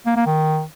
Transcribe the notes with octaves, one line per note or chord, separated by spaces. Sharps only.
A#3
A#3
D#3